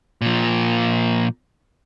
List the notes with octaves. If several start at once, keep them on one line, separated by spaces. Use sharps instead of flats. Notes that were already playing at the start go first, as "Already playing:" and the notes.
A#2 F3